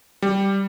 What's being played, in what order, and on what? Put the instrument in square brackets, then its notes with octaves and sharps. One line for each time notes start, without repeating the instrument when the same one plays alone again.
[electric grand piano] G3